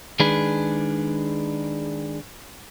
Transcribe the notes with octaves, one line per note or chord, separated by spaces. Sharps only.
D#3 G#3 D4 G#4 B4